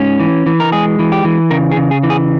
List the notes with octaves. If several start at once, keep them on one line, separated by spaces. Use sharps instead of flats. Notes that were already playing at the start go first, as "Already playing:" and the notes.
Already playing: G#2 C#4
E3
E3
A#4
G#3 G#4
E3
G4
E3
C#3 A#4
G#4
C#3
G#4
E3
G#4